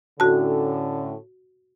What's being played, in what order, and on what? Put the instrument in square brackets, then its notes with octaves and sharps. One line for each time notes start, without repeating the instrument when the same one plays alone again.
[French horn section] A2 D3 C#4 [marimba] F#4 A5